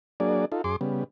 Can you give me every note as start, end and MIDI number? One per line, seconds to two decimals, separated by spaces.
0.20 0.45 54
0.20 0.45 58
0.20 0.45 62
0.20 0.45 68
0.20 0.45 74
0.52 0.62 63
0.52 0.62 65
0.52 0.62 69
0.64 0.76 42
0.64 0.76 68
0.64 0.76 84
0.64 0.76 86
0.81 1.04 49
0.81 1.04 55
0.81 1.04 59